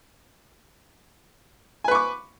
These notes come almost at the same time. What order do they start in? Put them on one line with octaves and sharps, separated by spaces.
G#5 B4 C#6 D6